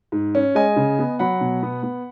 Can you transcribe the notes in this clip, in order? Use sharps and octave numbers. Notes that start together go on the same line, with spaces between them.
G#2
C#4
G#3 D#5 G#5
C#3
B3
F#3 F#5 B5
B2
B3
B3